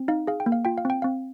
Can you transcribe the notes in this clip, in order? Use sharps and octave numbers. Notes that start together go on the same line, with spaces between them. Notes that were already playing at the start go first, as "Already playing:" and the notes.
Already playing: C4
D#4 F5
G#4 F5
G5
A#3
F5
F4 G5
F5
C4 G5
C4 F5